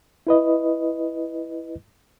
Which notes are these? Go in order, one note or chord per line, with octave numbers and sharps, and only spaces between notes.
E4 B4 D#5